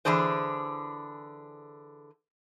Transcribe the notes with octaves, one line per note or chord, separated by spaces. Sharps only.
D3 E3 D4 G#4 C5